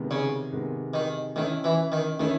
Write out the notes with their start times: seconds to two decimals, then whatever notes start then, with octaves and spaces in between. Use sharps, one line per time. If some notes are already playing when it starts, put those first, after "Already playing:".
Already playing: C3 D#3 G#3 B3
0.11 C#3
0.53 C3 D#3 G#3 B3
0.94 D#3
1.36 D#3 A3 C#4 E4
1.64 E3
1.92 D#3
2.19 D#3 A3 C#4 E4